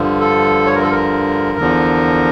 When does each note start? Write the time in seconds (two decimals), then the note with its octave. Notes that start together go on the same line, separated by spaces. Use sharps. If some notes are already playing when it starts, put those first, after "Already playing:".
Already playing: G2 D3 F3
0.20 A4
0.66 C#5
0.75 A#4
0.83 A4
0.91 A#4
1.58 E2 D3 F3